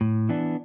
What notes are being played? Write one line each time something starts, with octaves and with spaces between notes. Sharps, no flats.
A2
E3 B3 D4